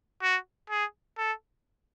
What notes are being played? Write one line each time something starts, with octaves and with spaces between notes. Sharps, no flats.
F#4
G#4
A4